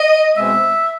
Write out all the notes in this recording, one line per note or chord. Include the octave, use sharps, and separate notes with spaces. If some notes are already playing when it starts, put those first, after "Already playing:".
Already playing: D#5
B2 G#3 C4 E5